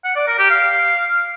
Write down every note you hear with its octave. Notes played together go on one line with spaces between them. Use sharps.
F#5
D5
A#4
G4
F5